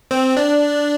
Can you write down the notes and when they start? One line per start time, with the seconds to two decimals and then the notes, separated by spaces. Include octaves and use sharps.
0.11 C4
0.37 D4